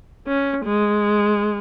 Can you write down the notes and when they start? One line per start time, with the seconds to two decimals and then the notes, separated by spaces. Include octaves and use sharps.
0.27 C#4
0.65 G#3